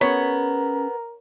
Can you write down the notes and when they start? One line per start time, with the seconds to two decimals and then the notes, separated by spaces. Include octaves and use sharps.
0.01 B3 C#4 G#4 A#4 C#5 B5